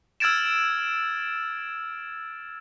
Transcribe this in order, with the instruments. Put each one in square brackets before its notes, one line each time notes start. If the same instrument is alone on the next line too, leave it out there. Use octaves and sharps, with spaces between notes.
[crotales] E6 F6 G#6 A6 D7 E7